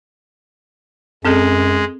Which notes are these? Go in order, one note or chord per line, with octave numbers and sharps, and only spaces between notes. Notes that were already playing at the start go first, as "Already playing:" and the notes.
F#2 G#3 C4 G#4 A4